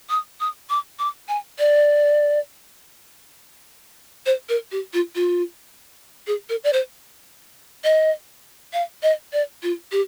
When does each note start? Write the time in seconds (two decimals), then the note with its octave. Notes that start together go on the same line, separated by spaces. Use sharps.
0.10 D#6
0.40 D#6
0.69 D6
0.99 D6
1.28 G#5
1.59 D5
4.26 C5
4.49 A#4
4.71 G4
4.93 F4
5.15 F4
6.27 G#4
6.49 A#4
6.64 D5
6.73 C5
7.84 D#5
8.73 F5
9.03 D#5
9.32 D5
9.63 F4
9.92 G4